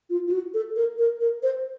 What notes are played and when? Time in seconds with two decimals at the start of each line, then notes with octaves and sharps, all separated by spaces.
0.10 F4
0.27 F4
0.31 F#4
0.54 A4
0.76 A#4
0.98 A#4
1.21 A#4
1.43 C5